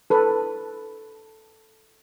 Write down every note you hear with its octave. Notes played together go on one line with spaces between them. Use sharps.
A4 B4